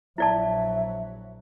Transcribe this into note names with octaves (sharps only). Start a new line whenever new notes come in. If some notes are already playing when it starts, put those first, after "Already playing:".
A#1 F#3 E4 D5 E5 A5